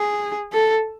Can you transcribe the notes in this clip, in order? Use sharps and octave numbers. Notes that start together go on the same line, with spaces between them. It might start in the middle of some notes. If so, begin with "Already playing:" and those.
Already playing: G#4
A4